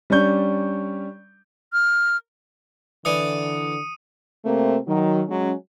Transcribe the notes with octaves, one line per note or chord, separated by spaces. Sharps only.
G3 C#4 D4 C#6 G6
F6
D3 E3 D5 G#5 D#6 C#7 D#7
C3 A3 A#3 C4 A#4
D#3 F#3
F#3 G#3 C#4